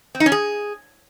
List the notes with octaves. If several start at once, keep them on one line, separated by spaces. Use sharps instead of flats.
C4
D#4
C#4
G#4